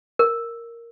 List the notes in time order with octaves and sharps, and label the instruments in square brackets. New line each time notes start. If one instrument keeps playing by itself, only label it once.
[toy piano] A#4